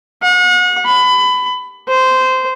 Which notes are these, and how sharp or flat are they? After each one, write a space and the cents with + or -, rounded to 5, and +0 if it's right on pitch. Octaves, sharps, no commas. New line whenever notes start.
F#5 -40
B5 +25
C5 -15